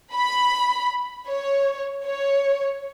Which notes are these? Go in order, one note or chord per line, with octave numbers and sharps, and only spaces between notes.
B5
C#5
C#5